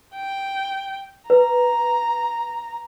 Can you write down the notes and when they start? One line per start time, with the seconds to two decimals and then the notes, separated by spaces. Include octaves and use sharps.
0.16 G5
1.30 B4 A#5